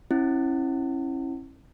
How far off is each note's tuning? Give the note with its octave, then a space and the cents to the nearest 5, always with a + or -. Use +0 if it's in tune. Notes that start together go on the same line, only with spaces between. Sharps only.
C#4 -35 E4 +0